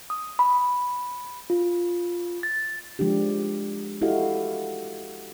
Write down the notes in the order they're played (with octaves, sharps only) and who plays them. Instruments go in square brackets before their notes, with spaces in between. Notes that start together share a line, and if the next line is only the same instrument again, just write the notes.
[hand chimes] D#6
B5
F4
A6
[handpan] F3 G#3 D4 G4
E4 F#4 G4 A4 D#5 F5